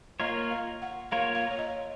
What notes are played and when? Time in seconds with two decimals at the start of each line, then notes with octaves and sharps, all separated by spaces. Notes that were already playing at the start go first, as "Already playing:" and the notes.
0.20 A#3 F4 A#4 C#5 D#5
0.51 F5
0.82 F#5
1.12 A#3 F4 A#4 C#5 F5
1.35 F5
1.51 C#5
1.59 D#5